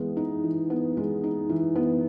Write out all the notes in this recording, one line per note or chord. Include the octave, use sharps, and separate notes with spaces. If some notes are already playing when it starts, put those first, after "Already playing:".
Already playing: E3 G#3 B3
D#4
E3
B3
G#3
D#4
E3
B3